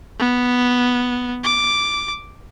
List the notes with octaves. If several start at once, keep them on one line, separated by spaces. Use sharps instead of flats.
B3
D6